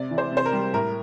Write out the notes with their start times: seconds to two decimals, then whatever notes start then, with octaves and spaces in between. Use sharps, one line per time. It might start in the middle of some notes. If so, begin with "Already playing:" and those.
Already playing: C3 D5
0.11 E3
0.18 C5
0.31 C3
0.37 C5
0.45 A#4
0.52 G3
0.74 A2 A#4